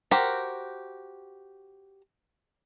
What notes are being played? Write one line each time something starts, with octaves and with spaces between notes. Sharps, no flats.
F#4 G4 A#4 C5